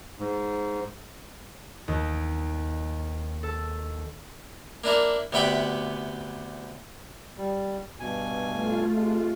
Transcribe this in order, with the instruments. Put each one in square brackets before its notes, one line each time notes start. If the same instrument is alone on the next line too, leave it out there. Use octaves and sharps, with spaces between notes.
[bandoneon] G#2
[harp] D#2
A4
[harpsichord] A#3 D4 E4 A#4
D2 C3 B3 E5 G5 B5
[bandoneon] G3
G2 B2 G#5
[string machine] A3 F4
[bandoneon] C3 G#3